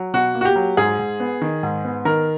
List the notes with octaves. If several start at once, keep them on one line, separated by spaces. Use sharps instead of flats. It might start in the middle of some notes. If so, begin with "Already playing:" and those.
Already playing: F#3
B2 F#4
A#3
F#4
G4
F#3
G#2 G#4
G#2
B3
D#3
G#2
B3
D#3 A#4